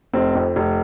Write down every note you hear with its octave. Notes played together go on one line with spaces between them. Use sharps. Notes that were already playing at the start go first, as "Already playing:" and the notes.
F1 C4
F2
F1